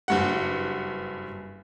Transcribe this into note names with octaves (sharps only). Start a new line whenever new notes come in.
F#1 G2 F#5